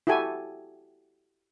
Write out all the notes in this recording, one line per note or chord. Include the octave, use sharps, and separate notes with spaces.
E4 F#4 G4 A4 G#5